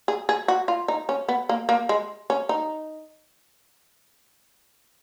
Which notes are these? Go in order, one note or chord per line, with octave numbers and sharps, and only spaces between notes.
G#4
G#4
F#4
F4
D#4
C#4
B3
A#3
A#3
G#3
C#4
D#4